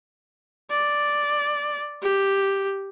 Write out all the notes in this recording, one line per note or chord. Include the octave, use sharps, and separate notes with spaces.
D5
G4